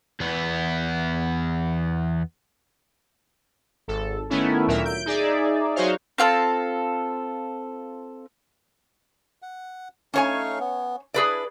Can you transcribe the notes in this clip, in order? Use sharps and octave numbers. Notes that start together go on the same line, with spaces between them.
E2 B3
G#1 A4
D#3 A3 B3 C#4 E4
D2 A#2 F#3 A#4 E5
G6 D7
D#4 G#4 D5 E5
F#3 D#4 F#4 C5 C#5 F5
C4 F4 A4 A5
F#5
A3 C#4 D#4 C#5 F5 G#5
B3
D4 E4 G#4 B4 D5